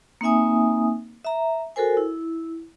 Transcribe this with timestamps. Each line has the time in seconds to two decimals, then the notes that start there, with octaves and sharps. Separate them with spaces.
0.21 A#3 C4 D#4 E5 G#5 D#6
1.25 E5 A#5
1.76 F#4 A4 A#4 C5 G#5
1.97 E4